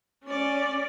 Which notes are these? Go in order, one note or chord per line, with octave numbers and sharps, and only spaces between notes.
C#4 D5